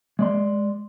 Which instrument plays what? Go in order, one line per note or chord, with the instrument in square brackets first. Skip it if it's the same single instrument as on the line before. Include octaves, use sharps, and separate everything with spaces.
[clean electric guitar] G#3 D5 C6